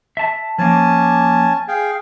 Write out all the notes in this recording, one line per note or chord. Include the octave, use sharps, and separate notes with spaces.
E5 A5
F3 A#3 C#4 G#5 A5
G#4 F5 G5